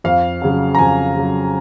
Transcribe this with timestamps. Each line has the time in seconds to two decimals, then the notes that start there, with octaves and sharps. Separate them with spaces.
0.04 F2 F5
0.42 C#3 F#3
0.75 A#5
0.79 F2 G#5
1.16 C#3 F#3